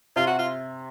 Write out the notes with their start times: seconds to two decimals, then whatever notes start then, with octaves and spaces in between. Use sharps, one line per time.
0.16 C3 F4
0.27 F#4
0.38 F4